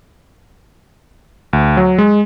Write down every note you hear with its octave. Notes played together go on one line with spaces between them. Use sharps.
D2
F#3
G#3